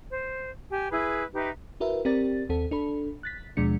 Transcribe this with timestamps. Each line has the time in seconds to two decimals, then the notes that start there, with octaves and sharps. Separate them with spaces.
0.11 C5
0.71 G4 G#5
0.92 E4 G#4 B4
1.34 D#4 G4 B4 E5
1.80 E4 F#4 A#4 B4 E5
2.05 C4 G4 A#4 D5 A6
2.49 D#2 C4 A4
2.71 D4 A4 B5
3.23 F#6 A6 B6
3.57 D#2 B2 F3 G#3 D4 C#7